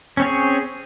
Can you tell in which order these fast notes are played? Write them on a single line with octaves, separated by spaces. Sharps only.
C#4 C4 C#5 G#4